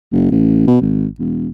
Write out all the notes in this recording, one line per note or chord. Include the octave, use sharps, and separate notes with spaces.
F#1
A1
B2
G#1
E1